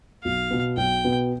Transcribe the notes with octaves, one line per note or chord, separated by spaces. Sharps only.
B1 F5
B2 B3
B1 G5
B2 B3